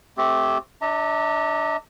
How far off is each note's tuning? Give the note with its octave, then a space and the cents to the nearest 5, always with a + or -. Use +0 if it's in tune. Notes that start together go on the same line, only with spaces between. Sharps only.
A3 -15 C4 -5 G4 +0
D4 +0 E5 -45 A#5 -45